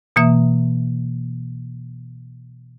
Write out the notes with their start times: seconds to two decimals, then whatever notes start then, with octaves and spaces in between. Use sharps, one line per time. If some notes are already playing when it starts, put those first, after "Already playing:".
0.16 B2 E3 A#3 E5 D#6